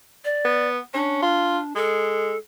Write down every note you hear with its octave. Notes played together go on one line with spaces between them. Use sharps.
D5
B3
C#4 D4
F4
G#3 A4